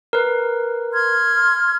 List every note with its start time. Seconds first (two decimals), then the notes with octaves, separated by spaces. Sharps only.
0.13 A#4 B4
0.93 C6 F6 G#6